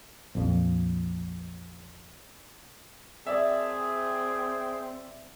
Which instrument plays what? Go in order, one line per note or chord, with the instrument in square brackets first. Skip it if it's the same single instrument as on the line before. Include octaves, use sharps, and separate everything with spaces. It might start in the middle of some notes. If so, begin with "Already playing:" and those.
[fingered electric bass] A#1 F2
[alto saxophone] C4 [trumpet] G#4 [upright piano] D5 E5